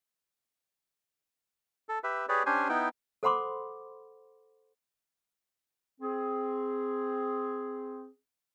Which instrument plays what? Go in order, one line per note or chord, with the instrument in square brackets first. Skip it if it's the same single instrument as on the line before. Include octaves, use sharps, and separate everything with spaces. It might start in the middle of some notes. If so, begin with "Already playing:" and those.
[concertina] A4
G4 B4 E5
G4 G#4 B4 C#5 D5
C#4 D4 G4 C5 G#5
B3 D#4 E4 G5
[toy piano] A4 C5 F#5 B5 C6 D6
[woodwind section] C4 G#4